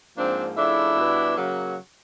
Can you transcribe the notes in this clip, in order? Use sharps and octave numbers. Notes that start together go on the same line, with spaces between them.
G#2 F3 A#3 C4 D4
C#3 F3 A3 D4 E4
B2 G3 B3
C#3 F#3 A#3